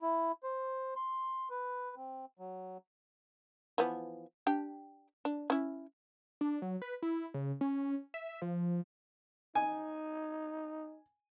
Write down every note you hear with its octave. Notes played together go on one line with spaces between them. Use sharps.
E4
C5
C6
B4
C4
F#3
E3 F3 B3
D4 G4 G5
D4
C#4 E4
D4
F#3
B4
E4
C#3
C#4
E5
F3
D#4 G#5